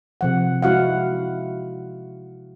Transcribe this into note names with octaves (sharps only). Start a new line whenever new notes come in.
C3 F3 F#5
G#3 E4 F#4 F5 F#5